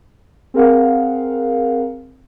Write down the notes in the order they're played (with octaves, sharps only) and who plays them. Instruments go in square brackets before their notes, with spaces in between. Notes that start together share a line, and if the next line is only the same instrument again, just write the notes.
[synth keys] C4 G#4 A#4 F5 F#5